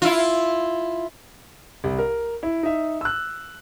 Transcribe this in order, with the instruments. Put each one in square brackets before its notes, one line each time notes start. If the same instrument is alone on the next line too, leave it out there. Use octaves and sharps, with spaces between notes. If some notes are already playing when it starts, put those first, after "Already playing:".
[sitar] E4 F4
[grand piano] C2
A#4
E4
D#4 E5
E6 F#6